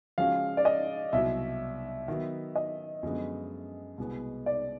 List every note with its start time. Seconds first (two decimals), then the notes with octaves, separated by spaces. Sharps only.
0.18 C#3 F3 G#3 C#4 F#4 F5
0.57 D5
0.65 D#5
1.13 C2 B2 F#3 E5
2.08 D#3 F#3 B3
2.55 D#5
3.03 F#2 D3 F3 G#3 B3
3.98 C2 B2 G#3 B3
4.46 D5